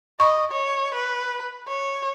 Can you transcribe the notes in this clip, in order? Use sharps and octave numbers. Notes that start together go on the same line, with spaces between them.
D#5 B5 C#6
C#5
B4
C#5